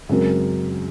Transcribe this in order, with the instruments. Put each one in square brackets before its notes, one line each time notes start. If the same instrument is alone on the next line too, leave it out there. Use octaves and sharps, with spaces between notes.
[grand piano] F#2 [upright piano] C#3 G#3 C4 F#4 A#4